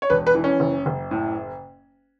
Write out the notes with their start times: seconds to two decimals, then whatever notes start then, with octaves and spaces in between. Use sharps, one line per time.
0.02 C#5
0.10 E1 B4
0.27 B4
0.35 E3
0.44 C#4
0.60 F#1
0.86 F#1
1.11 A2